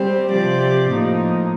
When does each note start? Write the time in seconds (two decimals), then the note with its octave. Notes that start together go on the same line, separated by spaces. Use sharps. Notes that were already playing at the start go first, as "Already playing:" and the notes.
Already playing: G3 C4 G4 C5
0.32 C3 F3 C4 G4 D5
0.90 A2 F3 A#3 D#4